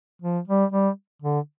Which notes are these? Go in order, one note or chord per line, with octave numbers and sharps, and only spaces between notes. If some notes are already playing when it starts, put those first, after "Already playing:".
F3
G3
G3
D3